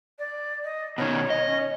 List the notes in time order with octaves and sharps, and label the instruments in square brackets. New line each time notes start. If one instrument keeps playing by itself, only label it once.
[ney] D5
D#5
[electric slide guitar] B2 D#3 [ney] C#5
[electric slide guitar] D#5
[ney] C#4